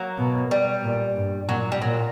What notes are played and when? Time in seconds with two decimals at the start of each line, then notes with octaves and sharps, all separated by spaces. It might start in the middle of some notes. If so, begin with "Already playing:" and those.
Already playing: F#3 A#3
0.18 B2
0.51 G3
0.84 A#2
1.16 G2
1.49 A#2 F#3
1.72 G3
1.82 A#2 F#3